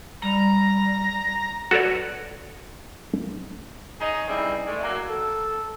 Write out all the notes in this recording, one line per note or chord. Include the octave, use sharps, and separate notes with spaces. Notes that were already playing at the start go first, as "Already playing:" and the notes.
G3 A#5
F#4 A4 B4 C#5 D5
D#4 G#4 C#5 D#5
C#3 E3 G3 C4 D#4 E4
G#3 A3 D5
F#3 A#3
A4